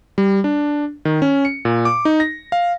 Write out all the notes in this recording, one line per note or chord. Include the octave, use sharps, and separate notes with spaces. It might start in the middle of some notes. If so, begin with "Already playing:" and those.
G3
D4
D#3
C#4
C#7
A#2
D6
D#4
A#6
F5